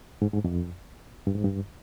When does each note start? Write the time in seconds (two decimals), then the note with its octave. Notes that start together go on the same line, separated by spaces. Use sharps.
0.22 G#2
0.33 G#2
0.44 F2
1.27 G2
1.36 G#2
1.44 G2